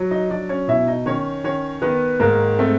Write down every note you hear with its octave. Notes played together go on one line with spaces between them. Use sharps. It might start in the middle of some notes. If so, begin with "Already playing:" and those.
Already playing: F#3
D#4 D#5
F#3 D4 D5
C#4 C#5
B2 E4 E5
D#4 D#5
D#3 C#4 C#5
D#3 C#4 C#5
D#3 B3 B4
G#2 A#3 A#4
A3 C4 A4